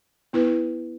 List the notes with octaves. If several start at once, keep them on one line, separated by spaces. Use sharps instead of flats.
B3 E4 B4